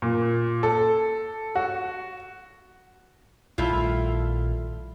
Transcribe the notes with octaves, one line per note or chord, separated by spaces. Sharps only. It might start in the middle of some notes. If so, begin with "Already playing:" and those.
A#2
A4
F#4
A#1 D#3 G3 A3 E4 F4